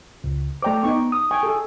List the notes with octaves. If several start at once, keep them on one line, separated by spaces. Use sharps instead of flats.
C#2
A3 C5 D5 G5 A#5 D6
B3 D#4 G5 C#6
D#6
G5 G#5 C#6
G#4 A4